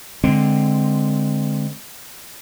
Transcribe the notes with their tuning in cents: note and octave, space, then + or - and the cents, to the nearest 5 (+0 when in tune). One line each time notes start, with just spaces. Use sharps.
D3 +0 G#3 +0 C4 +0